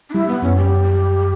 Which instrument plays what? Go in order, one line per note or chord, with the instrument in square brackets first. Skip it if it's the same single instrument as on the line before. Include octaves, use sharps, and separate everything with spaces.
[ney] D4
[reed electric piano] G3 [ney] E4
[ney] B3
[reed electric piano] F#2 [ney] C#4
[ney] G4